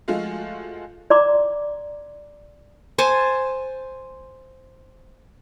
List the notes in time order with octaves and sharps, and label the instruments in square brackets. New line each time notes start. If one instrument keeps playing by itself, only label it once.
[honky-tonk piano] F3 G#3 A3 F4 F#4 F5
[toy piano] D5 A#5 C6 D6
[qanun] C5 G#5 A5